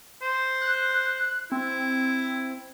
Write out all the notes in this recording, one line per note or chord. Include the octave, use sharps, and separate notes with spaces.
C5
F#6
C4 E4